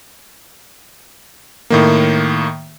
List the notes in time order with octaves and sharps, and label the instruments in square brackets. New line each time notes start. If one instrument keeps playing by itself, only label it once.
[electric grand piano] A2 D#3 A#3